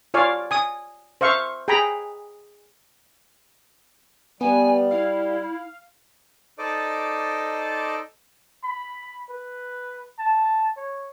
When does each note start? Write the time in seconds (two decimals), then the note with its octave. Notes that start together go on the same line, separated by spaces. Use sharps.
0.14 F4 C#5 D5 F5 G#5
0.51 G#5 D#6
1.21 C5 E5 F5 C#6
1.68 G#4 G5 G#5 A#5 B5
4.41 G3 B3 G#5
4.91 E4 F5
6.58 D#4 A4 C5 D5 D#5 D6
8.63 B5
9.29 B4
10.19 A5
10.77 C#5